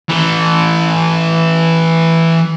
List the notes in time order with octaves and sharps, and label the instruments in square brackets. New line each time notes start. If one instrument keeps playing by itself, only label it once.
[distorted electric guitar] E3 A4